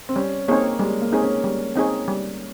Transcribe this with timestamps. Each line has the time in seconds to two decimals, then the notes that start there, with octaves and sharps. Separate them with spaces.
0.09 C4
0.16 G3 C#4
0.48 A#3 C4 D#4 G#4 C#5
0.79 G3 G#3
1.02 A#3
1.12 C4 D#4 G#4 C#5
1.22 C#4
1.44 G3
1.76 C4 D#4 G#4 C#5
2.08 G3